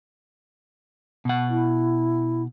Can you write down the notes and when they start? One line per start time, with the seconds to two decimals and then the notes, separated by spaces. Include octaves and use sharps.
1.25 B2 F#5
1.50 E4